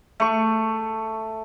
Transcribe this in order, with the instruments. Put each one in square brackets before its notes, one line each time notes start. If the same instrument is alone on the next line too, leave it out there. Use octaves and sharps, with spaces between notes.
[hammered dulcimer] A3 C#6